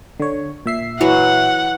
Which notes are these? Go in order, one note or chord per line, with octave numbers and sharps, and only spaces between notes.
D3 C#5
A#2 E5 C7
E3 F#3 F#4 F#5